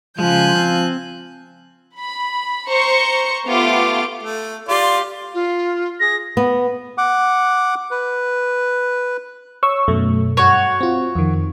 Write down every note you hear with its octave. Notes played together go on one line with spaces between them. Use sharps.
C#3 F3 G#3 F4 G#5 F#6 G6
C4
B5
C5 A#5 C#6 C#7
A3 B3 F4 G4 D6
A3
F4 G4 D5 C6
F4
G#4 A#6
B3
F#5 D6
B4
C#5 C#6 E6
F#2 B2 A3
G2 F#4 C#5
C4 F4
F2 D#3